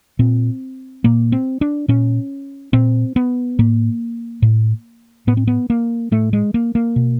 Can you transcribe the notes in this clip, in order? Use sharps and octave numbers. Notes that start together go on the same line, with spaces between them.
A#2 C4
A#2 A#3
C4
D4
A#2 C#4
A#2 C4
B3
A2 A#3
A2
A2 B3
C4
B3
A#3
A2 A3
G#3
A#3
A#3
B2